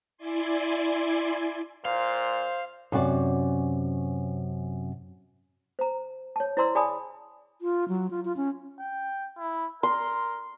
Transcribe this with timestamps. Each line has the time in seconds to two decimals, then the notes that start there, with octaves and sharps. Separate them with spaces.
0.18 E4 D5 G#5 C6
1.85 A#2 C5 F5
2.92 F#2 C3 F#4 D5
5.79 C5 A#5
6.36 C#5 A5
6.57 E4 C5 D5 A#5 C6 E6
6.75 G#4 D5 G#5 A5 B5 D#6
7.62 F4
7.89 F#3
8.11 F4
8.25 F4
8.37 C#4
8.79 G5
9.38 E4
9.83 A#4 C6